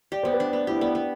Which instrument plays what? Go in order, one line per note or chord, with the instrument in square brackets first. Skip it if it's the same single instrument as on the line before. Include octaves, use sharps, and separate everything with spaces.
[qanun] G4 [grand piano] D5
[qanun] B3 [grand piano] C5
[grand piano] B4
[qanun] D4
B3
[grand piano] E4 [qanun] G4
[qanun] B3 [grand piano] D5
[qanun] B3